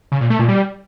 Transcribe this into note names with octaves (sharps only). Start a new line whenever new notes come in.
C#3
A#2
A3
A#2
G3